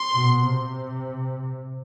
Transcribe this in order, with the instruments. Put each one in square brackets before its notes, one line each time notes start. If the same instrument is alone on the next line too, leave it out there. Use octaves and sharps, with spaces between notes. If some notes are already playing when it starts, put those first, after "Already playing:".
Already playing: [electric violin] C6
[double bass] B2
C3